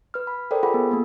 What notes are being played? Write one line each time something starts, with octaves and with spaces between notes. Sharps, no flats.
B4 F6
B5
A4 A#4 C5 D5 G5
F4 G#4 F#5 B5
B3
A#3 B3 A4